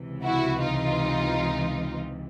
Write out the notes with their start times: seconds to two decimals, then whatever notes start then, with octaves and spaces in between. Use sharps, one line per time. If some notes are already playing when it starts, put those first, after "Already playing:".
Already playing: C#2 C3 E3
0.23 E4 F#4
0.61 D#4 F4